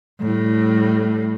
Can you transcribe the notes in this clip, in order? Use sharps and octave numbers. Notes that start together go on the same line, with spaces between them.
A2 G3